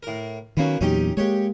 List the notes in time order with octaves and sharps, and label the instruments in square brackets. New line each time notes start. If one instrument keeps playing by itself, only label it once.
[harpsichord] A2 A#4
[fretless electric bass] D#3 C#4 [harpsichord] F#3 A#3 B3
[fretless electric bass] E2 A#2 F#3 [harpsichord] C#4 D#4 G4
[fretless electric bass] G#3 A#3 [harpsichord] G4 C#5